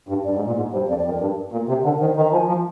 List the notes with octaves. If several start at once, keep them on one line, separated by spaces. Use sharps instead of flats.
G2
G2 D5
G#2
A#2
G#2
G2 C5
F2 D5
D5
F2
A#4
G2
A#2
C3
D3 A#4
D#3 C5
D#3 A#5
F3 G#5
F3